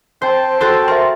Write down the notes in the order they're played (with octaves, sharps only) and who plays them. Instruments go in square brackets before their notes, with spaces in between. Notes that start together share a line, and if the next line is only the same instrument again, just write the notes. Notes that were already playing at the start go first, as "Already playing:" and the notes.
[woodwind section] C4 G5 A5 [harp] C5
[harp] F#4 A4 C5
[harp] A#4 [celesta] E5 C6